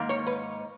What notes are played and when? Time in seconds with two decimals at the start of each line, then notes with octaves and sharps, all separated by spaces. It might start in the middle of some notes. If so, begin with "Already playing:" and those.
Already playing: G#2 D#3 A#3
0.09 C#5
0.27 B4